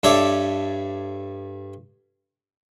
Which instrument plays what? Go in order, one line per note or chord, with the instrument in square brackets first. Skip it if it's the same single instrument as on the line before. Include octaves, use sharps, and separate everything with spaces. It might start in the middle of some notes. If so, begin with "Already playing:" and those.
[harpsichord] G2 A4 C#5 D5 E5